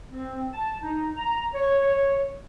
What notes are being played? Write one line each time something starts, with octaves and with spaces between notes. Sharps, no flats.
C4
A5
D#4
A#5
C#5